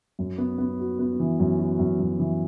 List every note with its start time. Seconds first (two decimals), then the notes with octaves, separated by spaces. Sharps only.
0.19 F#2
0.38 B3
0.58 B3
0.79 F#4
0.99 B3
1.20 E3
1.40 F#2
1.59 F#4
1.79 F#2
2.00 F#2
2.19 E3